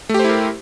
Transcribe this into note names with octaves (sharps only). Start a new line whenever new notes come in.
A3 E4 G4 A#4 C5